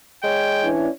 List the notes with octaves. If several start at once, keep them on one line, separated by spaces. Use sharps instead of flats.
G#3 C#5 G5
E3 C#4 D4